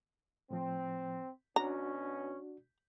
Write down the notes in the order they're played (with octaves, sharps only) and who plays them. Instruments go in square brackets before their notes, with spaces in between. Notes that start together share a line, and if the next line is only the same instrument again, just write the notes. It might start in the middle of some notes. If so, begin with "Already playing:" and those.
[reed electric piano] A2 F3 [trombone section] C4
[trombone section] B2 C#4 [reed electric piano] D4 F#4 D5 [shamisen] A#5